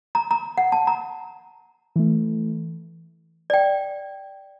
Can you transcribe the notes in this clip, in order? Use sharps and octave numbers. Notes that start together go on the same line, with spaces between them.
A#5
A#5
F#5
A5
A#5
E3 A3
D5 G5